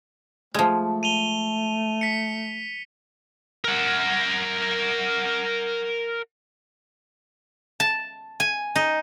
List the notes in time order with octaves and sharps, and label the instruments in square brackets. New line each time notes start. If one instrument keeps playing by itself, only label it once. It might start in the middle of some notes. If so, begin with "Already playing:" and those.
[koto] F3 G#3 [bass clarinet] A3
[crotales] D#7 F7 G7
B6 C#7
[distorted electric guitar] A#4 F#5
[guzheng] A5
G#5
D#4